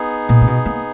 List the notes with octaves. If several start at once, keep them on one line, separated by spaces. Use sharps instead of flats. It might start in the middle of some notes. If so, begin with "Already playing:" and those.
Already playing: B3 D#4 G#4
A#2
C#3
B2
A#3